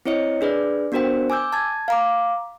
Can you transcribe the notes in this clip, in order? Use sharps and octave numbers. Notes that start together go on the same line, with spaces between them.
C4 E4 C#5 D#5 C#7
D4 G#4 B4 D5
B3 D4 F#4 A#4 C5 G5
G#5 D6 E6 G6
A5 G#6
F5 A#5 D6